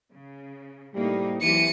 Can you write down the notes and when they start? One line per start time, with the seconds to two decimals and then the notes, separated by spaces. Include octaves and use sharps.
0.13 C#3
0.95 A2 C3 G3 A3 A#3 D#4
1.42 E3 F#3 C4 G4 C#7 D#7